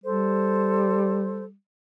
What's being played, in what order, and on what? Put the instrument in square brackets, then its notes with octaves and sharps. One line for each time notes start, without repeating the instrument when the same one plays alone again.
[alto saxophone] G3 [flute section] A4 C5